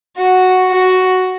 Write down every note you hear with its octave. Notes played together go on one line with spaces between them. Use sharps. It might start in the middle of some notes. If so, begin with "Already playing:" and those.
F#4
F#4